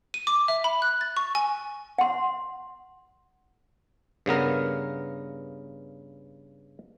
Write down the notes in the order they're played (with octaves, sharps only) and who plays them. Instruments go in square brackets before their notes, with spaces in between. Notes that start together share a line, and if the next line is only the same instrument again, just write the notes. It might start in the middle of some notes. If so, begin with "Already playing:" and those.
[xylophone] D#7
D6
E5
B5
F#6
A6
C#6
G#5
[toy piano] F#5 C6
[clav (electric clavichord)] G2 C#3 B3 A#4